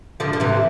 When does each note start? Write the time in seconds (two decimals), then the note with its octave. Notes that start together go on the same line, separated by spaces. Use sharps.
0.20 D3 F3
0.33 D3
0.40 C3 E3